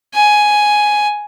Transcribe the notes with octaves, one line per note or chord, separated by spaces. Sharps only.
G#5